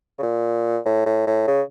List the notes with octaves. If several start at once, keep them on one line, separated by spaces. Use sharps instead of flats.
C#3
A#2
A2
A2
A2
C#3